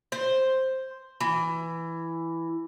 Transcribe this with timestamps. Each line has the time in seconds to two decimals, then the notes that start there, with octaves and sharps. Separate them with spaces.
0.12 C5
1.20 E3